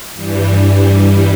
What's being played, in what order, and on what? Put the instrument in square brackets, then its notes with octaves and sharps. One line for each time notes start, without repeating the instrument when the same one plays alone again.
[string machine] G2 E3 G3